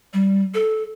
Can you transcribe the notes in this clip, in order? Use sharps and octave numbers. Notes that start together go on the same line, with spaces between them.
G3
A4